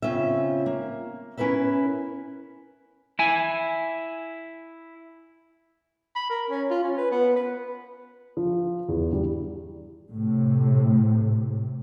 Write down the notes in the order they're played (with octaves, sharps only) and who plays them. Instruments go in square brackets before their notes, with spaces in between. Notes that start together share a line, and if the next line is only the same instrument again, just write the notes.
[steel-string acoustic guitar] C#3 C4 C#4 F4 E5
A#3
C#4 E4 A#4 B4 E5
[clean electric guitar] E4 G#5
[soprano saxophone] B5
A#4
C#4
F4
C#4
B4
B3
B4
[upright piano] F3
E2
G3
[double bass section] A2 C3